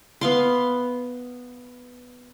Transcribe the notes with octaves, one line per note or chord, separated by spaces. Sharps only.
B3 F5 C6